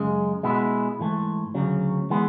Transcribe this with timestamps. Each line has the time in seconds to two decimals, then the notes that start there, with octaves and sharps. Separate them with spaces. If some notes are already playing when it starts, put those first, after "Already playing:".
Already playing: F#2 C#3 G#3
0.43 B2 G#3 B3 E4
0.99 G#2 E3 A3
1.55 D2 C#3 F#3
2.10 E3 G#3 B3